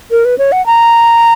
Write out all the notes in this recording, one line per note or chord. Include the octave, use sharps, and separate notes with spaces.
A#4
B4
C#5
F#5
A#5